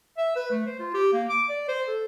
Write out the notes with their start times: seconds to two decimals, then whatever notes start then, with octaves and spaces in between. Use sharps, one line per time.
0.17 E5
0.36 B4
0.51 A3
0.66 C5
0.79 F4
0.94 G4
1.13 A#3
1.29 D6
1.49 D5
1.68 C5
1.88 A4